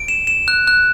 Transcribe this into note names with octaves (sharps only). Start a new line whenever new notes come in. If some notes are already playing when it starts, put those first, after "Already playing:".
Already playing: D7
E7
E7
F#6
F#6